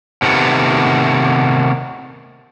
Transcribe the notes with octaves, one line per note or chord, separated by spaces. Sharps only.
C3 D#3 A3 B3